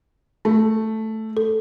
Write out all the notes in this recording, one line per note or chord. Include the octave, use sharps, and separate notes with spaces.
A3
A4